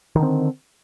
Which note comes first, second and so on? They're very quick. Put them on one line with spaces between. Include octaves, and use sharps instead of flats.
D#3 D3 C4